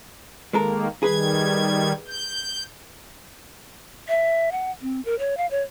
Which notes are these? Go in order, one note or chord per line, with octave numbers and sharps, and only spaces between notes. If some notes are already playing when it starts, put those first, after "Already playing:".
D#3 G#3 A#3 A4 A#4
D#3 G3 G#4 B4 G#6
G6
E5
F#5
C4
A#4
C#5
F5
C#5